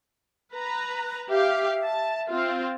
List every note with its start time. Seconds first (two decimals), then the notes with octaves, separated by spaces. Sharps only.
0.52 B4 A#5
1.29 G4 E5 F5
1.84 A5
2.28 C4 F4